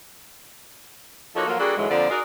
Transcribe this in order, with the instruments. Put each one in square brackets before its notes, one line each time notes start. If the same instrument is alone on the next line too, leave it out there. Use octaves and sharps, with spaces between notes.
[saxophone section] F3 A#3 D#4 F#4 A4 C#5
F3 F#3 A#3 F4 F#4 A4
G3 A#3 D4 F#4 G#4 A4
G#2 D3 E3 F#3 G#3
F2 A#2 D3 F3 D5
D#4 F#4 G#4 A#4 D5